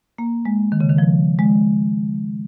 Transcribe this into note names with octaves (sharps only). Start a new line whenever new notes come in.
A#3
G#3
D#3
C#3
D#3
F3
G#3